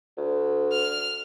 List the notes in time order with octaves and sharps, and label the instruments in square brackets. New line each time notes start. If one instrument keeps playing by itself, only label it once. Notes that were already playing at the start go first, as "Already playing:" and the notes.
[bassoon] D2
[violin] F6